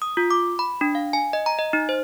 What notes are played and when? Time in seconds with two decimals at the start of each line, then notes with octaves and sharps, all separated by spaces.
0.02 D#6
0.17 F4
0.31 D6
0.59 B5
0.81 D4
0.95 F5
1.13 G#5
1.33 D#5
1.46 A#5
1.59 D#5
1.73 D#4
1.89 C5